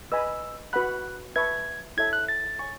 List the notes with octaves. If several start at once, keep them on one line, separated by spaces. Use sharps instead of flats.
B4 D#5 G#5 B5 E6
F#4 B4 F#5 B5 F#6
B4 E5 A5 C#6 G#6
E4 A4 C#5 E5 G#6
F#6
A6
C#5 G#5 C#6